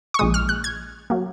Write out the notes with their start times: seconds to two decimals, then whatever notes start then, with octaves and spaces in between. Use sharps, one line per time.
0.14 C#6
0.19 A#1 A#2 G#3 D#6
0.34 F6
0.49 F#6
0.64 G#6
1.10 F#3 A#3